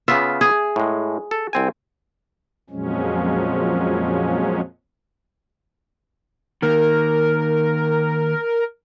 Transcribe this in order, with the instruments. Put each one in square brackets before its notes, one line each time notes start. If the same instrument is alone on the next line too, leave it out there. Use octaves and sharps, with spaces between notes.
[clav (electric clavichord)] C#3 B3 F4 [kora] E5
[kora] G#4
[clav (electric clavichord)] A2 G#3
A4
C2 C4 G#5
[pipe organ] F2 A#2 F3 F#3 G#3 C#4
[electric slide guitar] D#3 A#3 [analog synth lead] A#4